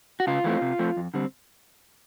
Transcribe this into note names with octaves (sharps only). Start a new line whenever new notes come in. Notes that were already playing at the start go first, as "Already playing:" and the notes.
F#4
C#3 F4
E3 A3 C4
C3
F3 A3 C4
F2
D3 G3 C4